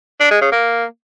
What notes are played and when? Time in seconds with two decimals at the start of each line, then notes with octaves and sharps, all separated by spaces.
0.20 D4
0.31 G#3
0.41 C#3
0.52 A#3